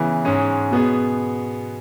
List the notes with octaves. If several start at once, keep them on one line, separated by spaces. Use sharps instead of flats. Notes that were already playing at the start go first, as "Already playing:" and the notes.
Already playing: C#3 E3 B3
G#2 G#3 C#4 G#4
B2 B3 G#4